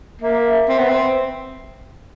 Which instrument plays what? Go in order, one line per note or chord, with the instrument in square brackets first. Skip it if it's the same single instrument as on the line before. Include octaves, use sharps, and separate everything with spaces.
[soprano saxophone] A#3 [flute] E5
[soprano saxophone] C4
B3
C4